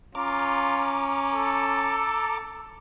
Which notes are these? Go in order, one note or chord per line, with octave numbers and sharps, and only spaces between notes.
C#4 F4 A#5 D6
A4